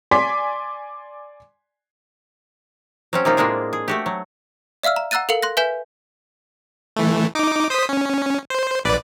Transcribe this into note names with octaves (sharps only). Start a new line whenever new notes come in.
D5 G#5 C6 D6 B6
F#3 C4 C#4
C3 A#3 D#4 F4 G4
A2 G#3 A#3 D4 G#4
G#4
A3 F#4 G4
F#3
D5 E5 F5 E6 F6
A#5
F#5 A#5 E6 F#6 A6 D#7
A4 A#4 F5 C#7 F#7
C6 F#6 A#6
B4 E5 G#5 G6 B6 E7
E3 A3
D#4 D6
C5 D#6 B6
C#4
C5
A#1 B4 D5